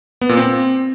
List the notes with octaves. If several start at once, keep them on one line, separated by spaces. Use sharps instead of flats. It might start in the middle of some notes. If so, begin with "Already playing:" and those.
B3
A#2
C4